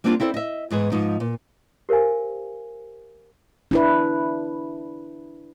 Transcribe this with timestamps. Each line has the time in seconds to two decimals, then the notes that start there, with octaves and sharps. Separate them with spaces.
0.04 G3 A#3 C4 D4 D#4 F4
0.20 C4 E4 A4 C5 D5
0.34 D#5 E5
0.70 E2 G#2 G#4 B4
0.92 G#2 F3 D#4
1.20 A#2
1.89 G4 A#4 C5 F5 G#5
3.71 D4 E4 B4